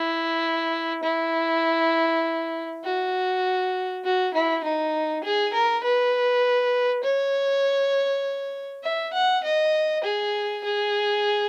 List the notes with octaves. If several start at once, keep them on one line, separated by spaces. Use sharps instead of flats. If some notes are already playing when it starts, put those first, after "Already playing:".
Already playing: E4
E4
F#4
F#4
E4
D#4
G#4
A#4
B4
C#5
E5
F#5
D#5
G#4
G#4